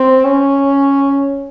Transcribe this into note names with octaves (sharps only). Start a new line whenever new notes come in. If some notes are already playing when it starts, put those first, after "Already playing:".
Already playing: C4
C#4